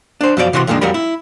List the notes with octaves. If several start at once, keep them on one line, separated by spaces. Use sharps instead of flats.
D4 C5
F#2 B2 F3 F#4 D5
C3 E3 F#4 F5 C6
F2 A#2 D#3 G#3 D4
F2 F#3 G3 A#4 B5
E4